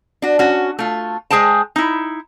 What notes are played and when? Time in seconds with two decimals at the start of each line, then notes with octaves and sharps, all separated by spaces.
0.22 D4 F#4
0.39 C#4 F#4
0.79 A3 F4
1.31 G#3 G#4 C5 G5 A5
1.76 D#4 E4